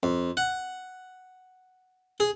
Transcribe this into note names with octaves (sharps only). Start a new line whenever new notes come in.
F2
F#5
G#4